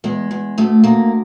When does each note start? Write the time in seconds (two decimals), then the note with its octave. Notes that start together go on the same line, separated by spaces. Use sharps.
0.04 E2 G#3
0.31 E2
0.58 D2 A3
0.84 D2 A#3